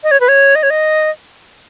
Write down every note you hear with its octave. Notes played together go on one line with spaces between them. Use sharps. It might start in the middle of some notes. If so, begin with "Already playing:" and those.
D#5
C#5
B4
C#5
D#5
C#5
D#5